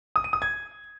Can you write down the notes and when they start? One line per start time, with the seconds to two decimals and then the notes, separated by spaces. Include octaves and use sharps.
0.16 D#6
0.24 D#7
0.33 D#6
0.42 G#6